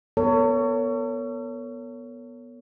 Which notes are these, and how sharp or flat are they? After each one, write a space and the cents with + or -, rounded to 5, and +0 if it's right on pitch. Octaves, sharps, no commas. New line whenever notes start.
B3 -15 A4 +45 C#5 +20